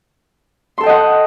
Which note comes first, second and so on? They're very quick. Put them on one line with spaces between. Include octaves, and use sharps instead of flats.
C6 A4 G5 D#5 F#5